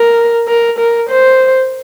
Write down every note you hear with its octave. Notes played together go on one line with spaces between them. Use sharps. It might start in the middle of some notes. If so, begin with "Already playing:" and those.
Already playing: A#4
A#4
A#4
C5